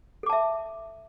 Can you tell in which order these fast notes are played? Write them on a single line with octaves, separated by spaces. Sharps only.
A4 D6 A5 E5